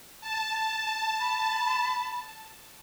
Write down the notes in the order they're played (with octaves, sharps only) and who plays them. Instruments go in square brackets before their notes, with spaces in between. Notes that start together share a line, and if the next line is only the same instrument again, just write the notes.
[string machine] A5
[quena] B5